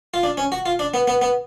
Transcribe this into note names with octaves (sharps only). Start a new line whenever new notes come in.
F4
D4
C#4
F#4
F4
D4
B3
B3
B3